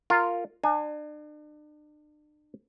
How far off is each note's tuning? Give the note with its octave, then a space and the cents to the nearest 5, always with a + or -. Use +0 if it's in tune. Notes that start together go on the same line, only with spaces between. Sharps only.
F4 +0 A#4 -15
D4 +40 G#5 +10